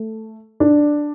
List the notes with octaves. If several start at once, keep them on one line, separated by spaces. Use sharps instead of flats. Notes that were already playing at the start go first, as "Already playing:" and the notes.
Already playing: A3
D4